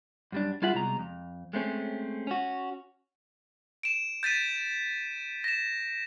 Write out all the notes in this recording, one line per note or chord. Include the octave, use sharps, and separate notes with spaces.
F#2 G3 D4
G3 E4 F4 G#4 E5 F#5
C2 B2 G#3 A#5
F2
G#3 A3 C4 C#4
C#4 F#4
D7 E7
G6 A6 B6 D#7
A#6 E7